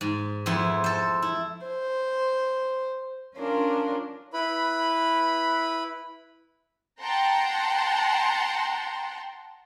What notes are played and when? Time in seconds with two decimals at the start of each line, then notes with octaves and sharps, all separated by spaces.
0.01 G#2
0.46 F2 B3 E4 C6
0.84 A4 C5
1.22 E4
1.66 C5
3.35 C#4 D4 F4 A#4
4.33 E4 B4 B5
7.00 F#5 G5 A5 A#5 C6